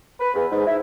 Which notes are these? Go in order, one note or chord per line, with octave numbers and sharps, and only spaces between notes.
B4
E2
G#2
E4